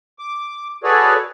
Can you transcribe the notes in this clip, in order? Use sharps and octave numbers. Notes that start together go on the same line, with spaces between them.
D6
F#4 G#4 A4 B4 C#5 D5